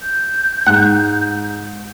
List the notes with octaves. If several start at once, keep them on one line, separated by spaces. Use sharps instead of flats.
G6
G#2 F#5